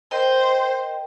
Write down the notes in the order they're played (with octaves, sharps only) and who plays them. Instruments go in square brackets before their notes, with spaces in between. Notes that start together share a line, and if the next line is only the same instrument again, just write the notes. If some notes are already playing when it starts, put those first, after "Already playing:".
[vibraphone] A#4 D#5 G5 [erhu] C5